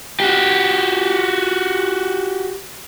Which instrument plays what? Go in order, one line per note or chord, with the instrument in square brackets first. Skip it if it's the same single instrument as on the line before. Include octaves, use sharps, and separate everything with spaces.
[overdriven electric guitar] F#4 G4